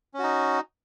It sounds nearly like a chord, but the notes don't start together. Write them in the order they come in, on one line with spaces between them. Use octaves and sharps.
C#4 F#4 D#4